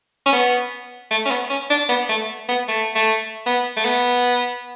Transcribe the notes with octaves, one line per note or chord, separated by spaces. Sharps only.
C#4
B3
A3
C#4
B3
C#4
D4
B3
A3
B3
A3
A3
B3
A3
B3